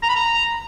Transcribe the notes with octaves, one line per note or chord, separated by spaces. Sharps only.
A#5
B5
A#5